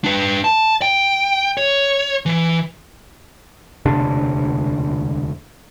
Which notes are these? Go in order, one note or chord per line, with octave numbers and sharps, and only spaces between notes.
D4 B4
A5
G5
C#5
E3
E1 D2 C3 D4